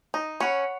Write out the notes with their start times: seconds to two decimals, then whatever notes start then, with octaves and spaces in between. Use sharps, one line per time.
0.14 D#4
0.40 C#4 C#5 F#5 B5